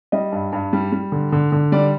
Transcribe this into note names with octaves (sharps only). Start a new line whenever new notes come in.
G3 D#5
G2
G2
G3
G3
D3
D3
D3
G3 D5